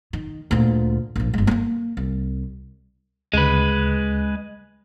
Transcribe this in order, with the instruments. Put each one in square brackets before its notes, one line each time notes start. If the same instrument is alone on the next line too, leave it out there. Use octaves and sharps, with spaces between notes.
[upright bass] D#3
D2 A#2
A#1 F3
G1 G#3
A3 A#3
C2
[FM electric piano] D2 C#3 [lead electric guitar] G#3 B4